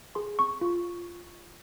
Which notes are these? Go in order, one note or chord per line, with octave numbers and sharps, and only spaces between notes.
G#4 C6
C4 C#6
F4